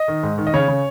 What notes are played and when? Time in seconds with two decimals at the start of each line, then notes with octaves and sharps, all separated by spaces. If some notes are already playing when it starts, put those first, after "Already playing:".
Already playing: D#5
0.08 D#3
0.23 G#2
0.38 D#3
0.47 D#5
0.54 C#3 C#5
0.68 C#3